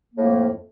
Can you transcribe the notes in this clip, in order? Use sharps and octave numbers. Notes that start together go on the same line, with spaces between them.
F2 A2 A#3